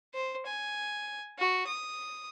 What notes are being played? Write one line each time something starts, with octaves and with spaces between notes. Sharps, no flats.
C5
G#5
F#4
D#6